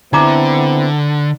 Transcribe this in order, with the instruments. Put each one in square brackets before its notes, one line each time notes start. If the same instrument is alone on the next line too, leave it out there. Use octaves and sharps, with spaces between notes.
[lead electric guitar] D3 [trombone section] B3 C4 E4 [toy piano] D#4 A#5 D6